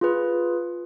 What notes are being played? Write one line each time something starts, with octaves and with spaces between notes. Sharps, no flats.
F4 G#4 B4